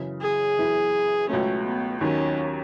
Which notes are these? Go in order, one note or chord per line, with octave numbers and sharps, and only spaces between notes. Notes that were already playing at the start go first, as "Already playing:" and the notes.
Already playing: F#2 C#3 E3
G#4
F#2 E3 B3 E4
C#2 B2 F#3 A3 C#4
B3
D#2 D#3 F#3 C#4